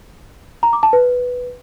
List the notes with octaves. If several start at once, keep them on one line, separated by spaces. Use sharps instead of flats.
A#5
D6
A5
B4